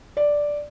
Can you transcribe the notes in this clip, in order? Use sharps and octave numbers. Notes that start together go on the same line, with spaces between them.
D5